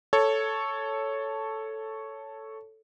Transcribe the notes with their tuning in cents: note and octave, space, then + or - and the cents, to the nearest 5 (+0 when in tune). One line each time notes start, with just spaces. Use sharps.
A4 +0 C#5 +0